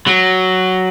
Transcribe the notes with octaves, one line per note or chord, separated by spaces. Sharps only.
F#3